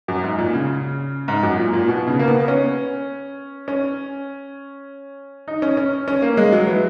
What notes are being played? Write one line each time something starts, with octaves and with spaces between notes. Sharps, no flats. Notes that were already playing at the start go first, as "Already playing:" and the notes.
F#2
G#2
A#2
C#3
G#2
F#2
A#2
A#2
B2
C#3
A#3
B3
B3
C#4
C#4
D#4
C#4
C#4
C#4
A#3
G#3
F#3
E3